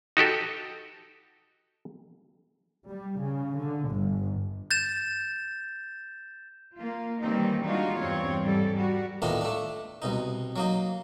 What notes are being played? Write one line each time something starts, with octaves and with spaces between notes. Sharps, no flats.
D#4 F#4 G4 A4
G3
C#3
D3
G1
G6 A6 E7
A#3 F4
D#3 E3 G3 A#3 C4 D#4
G3 G#3 D4 D#4 F4 F#4
E2 G2 G3 C4 C#5
G#2 G3 A4
G3 F#4
A2 D#3 A#3 B3 D4 F4
A3 D4
C2 B2 D#4
F#3 A#3 D#4